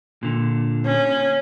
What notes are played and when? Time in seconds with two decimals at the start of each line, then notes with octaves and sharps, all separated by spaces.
0.23 A#2 D3
0.86 C#4